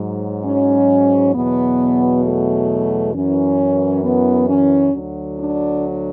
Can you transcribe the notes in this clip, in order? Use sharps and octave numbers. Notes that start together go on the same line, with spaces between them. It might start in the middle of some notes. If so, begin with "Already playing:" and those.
Already playing: G#2 F#3
C#4
E2 B2 F#3 B3
A3
F#2 E3 C#4
B3
C#4
D2 D3 F#3
D4